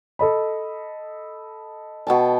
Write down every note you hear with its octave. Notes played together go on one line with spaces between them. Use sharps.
A4 D#5 B5
B2 G5 A5